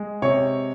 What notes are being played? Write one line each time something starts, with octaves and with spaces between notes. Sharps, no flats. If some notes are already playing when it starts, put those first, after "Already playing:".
Already playing: G#3
C3 C#5 C#6